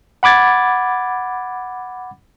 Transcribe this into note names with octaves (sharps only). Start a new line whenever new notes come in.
F#5 B5 D6 G#6 A6